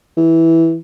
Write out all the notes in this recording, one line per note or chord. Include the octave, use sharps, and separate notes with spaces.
E3